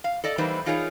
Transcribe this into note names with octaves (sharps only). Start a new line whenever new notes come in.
F5
A4 D5 D#5
E3 G3 A#3 D#4 B4 C5
E3 D#4 F4 G#4 A#4 C#5